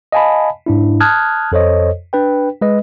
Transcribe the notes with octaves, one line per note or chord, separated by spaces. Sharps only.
D#5 F5 G#5 A5 B5
G#2 D4 E4
A5 D#6 F6 F#6 G#6
F2 A4 C5 C#5 D#5
D4 B4 G5
G#3 B4 D#5